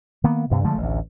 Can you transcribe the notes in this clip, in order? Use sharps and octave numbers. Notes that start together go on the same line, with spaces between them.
D#3 A#3 B3
D2 G2 C3
D3 F3 G#3 A3
A1 D2